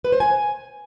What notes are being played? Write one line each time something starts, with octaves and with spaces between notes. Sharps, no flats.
B4
C5
G#5